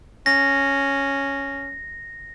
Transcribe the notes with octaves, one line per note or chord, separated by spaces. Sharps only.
C#4 A#6